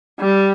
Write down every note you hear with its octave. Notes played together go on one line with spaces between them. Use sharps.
G3